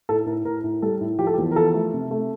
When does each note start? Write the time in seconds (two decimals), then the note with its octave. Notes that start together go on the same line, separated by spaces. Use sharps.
0.09 A2 A4
0.26 A2 A#4
0.45 A2 A#4
0.64 A2
0.82 G3 A4
1.01 A2
1.19 F3 G4
1.27 A4
1.34 G4
1.38 E2
1.51 A#4
1.56 F3 A4
1.74 A3
1.94 C3
2.11 A3